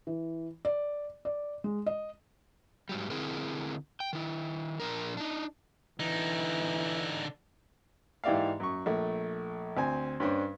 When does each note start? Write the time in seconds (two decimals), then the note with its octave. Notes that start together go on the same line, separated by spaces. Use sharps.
0.07 E3
0.65 D5
1.25 D5
1.64 G#3
1.86 D#5
2.89 G#2 F#3 G3
3.10 D3 C4 E4 G#4 A#4
4.00 G5
4.13 D#3 E4
4.80 A#2 F3 D4 A#4
5.17 D4 D#4
6.00 D3 E3 D#4
8.24 G#2 E3 G4 D5 E5 F5
8.60 F#2 C#6
8.86 A#1 A3
9.77 D2 C4 G#5
10.20 G2 C#4 D4 C5